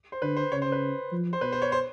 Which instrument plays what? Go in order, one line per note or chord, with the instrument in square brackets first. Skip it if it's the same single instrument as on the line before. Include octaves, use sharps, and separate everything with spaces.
[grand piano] C5
[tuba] D3 [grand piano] B4
[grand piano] C5
[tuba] C#3 [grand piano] C#5
[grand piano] C5
B4
[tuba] F3
[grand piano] C5
[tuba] B2 [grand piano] B4
[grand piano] C5
C#5
C5